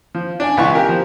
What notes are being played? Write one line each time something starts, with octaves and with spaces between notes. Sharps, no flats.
F3
D4 D5 G#5
C#2 E3 B3 F5 C#6
G4 A#4 G#5
F3